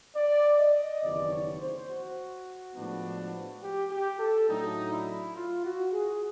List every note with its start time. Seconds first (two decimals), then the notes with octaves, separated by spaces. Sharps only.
0.15 D5
0.59 D#5
1.02 F#1 E2 C3 D#3 D5
1.31 C#5
1.60 C5
1.88 F#4
2.75 A2 F3 G#3 B3 D4
3.62 G4
3.90 G4
4.19 A4
4.48 A2 F#3 A3 D4 D#4
4.91 E4
5.34 F4
5.63 F#4
5.92 G#4